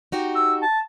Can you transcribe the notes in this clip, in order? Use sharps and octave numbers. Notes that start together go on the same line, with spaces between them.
D#4 F#4 G4
E6
A5